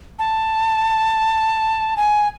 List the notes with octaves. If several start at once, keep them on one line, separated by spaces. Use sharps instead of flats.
A5
G#5